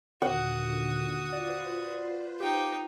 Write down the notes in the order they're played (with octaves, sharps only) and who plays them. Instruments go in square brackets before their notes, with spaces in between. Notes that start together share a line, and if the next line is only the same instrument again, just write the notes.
[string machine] D#2 A#2 D3 [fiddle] F#4 D#6 [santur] F#5
[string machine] F4 B4 C5 [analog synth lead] D5
[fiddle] D#4 G5 [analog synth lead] G4